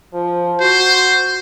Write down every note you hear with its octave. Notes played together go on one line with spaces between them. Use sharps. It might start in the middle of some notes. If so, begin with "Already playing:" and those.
F3
F#4 C5